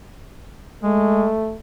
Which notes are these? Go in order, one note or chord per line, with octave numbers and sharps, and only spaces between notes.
G#3 A3